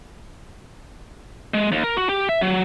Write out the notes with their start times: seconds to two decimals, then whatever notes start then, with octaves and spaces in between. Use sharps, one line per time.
1.54 G#3
1.72 D#2
1.84 A#4
1.97 F#4
2.09 G4
2.29 E5
2.41 F#3